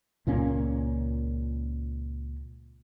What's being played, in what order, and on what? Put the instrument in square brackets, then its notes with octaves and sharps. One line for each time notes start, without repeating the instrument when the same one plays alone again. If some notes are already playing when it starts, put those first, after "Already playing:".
[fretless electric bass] C#2 A#2 A#3 C#4